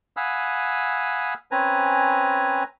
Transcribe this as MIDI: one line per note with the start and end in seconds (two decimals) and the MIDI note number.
0.17 1.34 77
0.17 1.34 78
0.17 1.34 80
0.17 1.34 83
0.17 1.34 87
0.17 1.34 88
1.52 2.64 60
1.52 2.64 61
1.52 2.64 71
1.52 2.64 80
1.52 2.64 82